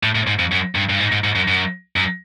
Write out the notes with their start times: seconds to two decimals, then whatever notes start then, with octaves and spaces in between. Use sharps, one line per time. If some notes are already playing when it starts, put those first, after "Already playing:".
0.03 A2
0.15 A2
0.27 G#2
0.39 F2
0.52 F#2
0.75 G2
0.89 G2
0.99 G#2
1.12 G#2
1.24 G#2
1.35 F#2
1.48 F#2
1.96 F#2